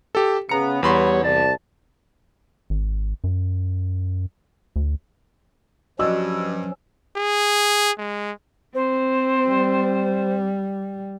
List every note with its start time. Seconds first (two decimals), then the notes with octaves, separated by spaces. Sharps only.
0.15 G4 A4
0.49 C#3 B3 A#5 C#7
0.83 E2 G3 B3 C#5 B5 C6
1.23 C2 D5 A5
2.70 G#1
3.24 F#2
4.76 D2
5.99 G2 F3 F#3 C#4 F#4 D5 D#5 E6
7.17 G#4
7.98 G#3
8.74 C4 C5
9.48 G3